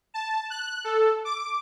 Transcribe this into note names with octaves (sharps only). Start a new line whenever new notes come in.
A5
F#6
A4
D6